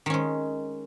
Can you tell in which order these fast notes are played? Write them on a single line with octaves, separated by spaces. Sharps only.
D#3 C#4 G#3